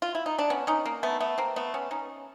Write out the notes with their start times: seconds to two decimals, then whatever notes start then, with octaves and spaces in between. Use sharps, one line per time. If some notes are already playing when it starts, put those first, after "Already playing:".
0.02 F4
0.15 E4
0.26 D#4
0.39 D4
0.50 B3 C#4
0.67 C#4 D#4
0.86 A#3
1.03 A3 B3
1.20 A3 B3
1.38 A#3 C4
1.56 A3 B3
1.74 B3 C#4
1.91 C#4 D#4